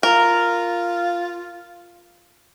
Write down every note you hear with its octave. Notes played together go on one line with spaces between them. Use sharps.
F4 A#4